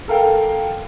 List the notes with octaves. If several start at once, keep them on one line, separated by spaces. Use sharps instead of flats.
A4 A#4 F5 G5